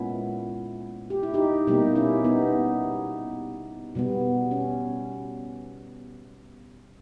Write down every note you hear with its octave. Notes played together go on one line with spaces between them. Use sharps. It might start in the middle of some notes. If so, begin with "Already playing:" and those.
Already playing: A#2 G#3 B3 C#4 E4
G4
E4
D#4 G4
B2 G3 A#3 D#4 G4
C#4 E4
B3 D#4
B2 G3 B3
C#4